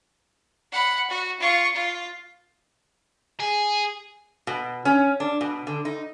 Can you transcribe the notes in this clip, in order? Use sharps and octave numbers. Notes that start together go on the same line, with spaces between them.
F#5 B5
F#4
F4 C#6
F4
G#4
B2
C#4
D4
B2
D3
D#4